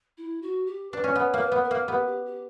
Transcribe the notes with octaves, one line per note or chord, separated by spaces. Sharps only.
E4
F#4
G4
D4 B4
C#4
B3 C#5
A#3
B4
B3
A#4
A#3
B3 G4
G4
G4